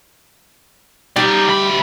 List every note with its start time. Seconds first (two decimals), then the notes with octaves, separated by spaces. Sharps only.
1.16 G3 D#4 G4 D5
1.48 D2 B5